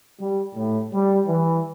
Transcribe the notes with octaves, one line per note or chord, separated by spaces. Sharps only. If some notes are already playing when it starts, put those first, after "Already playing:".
G3
A2
G3
E3